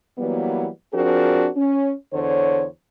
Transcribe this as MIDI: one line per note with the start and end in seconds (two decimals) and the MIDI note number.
0.18 0.67 52
0.18 0.67 54
0.18 0.67 55
0.18 0.67 58
0.18 0.67 59
0.93 1.47 53
0.93 1.47 60
0.93 1.47 62
0.93 1.47 66
0.93 1.47 68
0.93 1.47 70
1.56 1.92 61
2.13 2.66 40
2.13 2.66 50
2.13 2.66 72
2.13 2.66 73